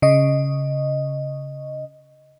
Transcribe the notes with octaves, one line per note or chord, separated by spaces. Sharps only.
C#3 D#5